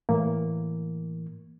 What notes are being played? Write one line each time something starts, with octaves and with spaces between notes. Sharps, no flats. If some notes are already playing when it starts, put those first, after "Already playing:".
A2 E3 A#3